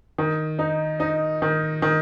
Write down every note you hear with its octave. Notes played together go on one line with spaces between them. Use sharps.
D#3
D#4
D#4
D#3
D#3